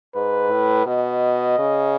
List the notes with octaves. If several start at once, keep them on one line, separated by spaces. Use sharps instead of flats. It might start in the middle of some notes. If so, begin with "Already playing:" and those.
G#2 B4
A2
B2 D#5
C#3